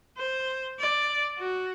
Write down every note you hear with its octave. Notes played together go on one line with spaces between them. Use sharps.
C5
D5
F#4